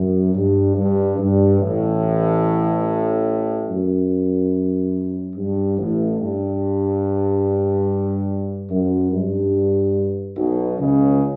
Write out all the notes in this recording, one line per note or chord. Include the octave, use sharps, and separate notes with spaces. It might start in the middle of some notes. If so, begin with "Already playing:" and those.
Already playing: F#2
G2
G2
G2
A1 A2
F#2
G2
A1 A2
G2
F#2
G2
B1 B2
C#2 C#3